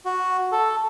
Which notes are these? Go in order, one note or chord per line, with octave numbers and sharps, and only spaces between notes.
F#4
A4